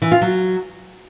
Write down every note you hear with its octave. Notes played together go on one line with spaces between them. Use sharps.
E3
F4
F#3